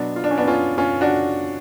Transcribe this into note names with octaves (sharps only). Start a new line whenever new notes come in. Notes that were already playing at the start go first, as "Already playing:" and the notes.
Already playing: B2 F#3 B3 D4
F4
D4
C#4
B3 D4
C#4 F4
C#4 F4
D4 F#4